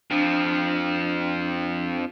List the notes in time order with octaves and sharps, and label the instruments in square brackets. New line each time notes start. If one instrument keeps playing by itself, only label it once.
[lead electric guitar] F2 F3 [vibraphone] D4